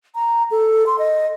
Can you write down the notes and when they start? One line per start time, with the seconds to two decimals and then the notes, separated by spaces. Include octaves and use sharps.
0.15 A#5
0.51 A4
0.86 C6
0.99 D#5